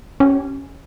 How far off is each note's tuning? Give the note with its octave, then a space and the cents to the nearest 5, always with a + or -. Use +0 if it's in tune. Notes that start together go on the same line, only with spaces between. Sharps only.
C#4 -5 G4 -30